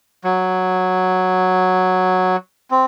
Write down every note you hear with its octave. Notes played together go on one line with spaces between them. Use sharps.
F#3
C4